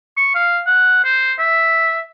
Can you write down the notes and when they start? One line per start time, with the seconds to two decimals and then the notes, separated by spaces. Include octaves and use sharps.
0.17 C#6
0.35 F5
0.67 F#5
1.04 C5
1.39 E5